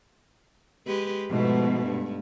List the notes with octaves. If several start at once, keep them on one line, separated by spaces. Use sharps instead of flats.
G#3 G4 B4
G#2 B2 F3 A3 E4
G2